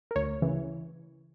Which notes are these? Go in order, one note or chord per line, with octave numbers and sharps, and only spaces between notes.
A#4
D2 C#5
C#3 E3